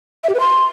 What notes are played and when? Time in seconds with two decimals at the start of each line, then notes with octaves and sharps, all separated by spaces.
0.24 E5
0.29 G4
0.34 B4
0.40 C6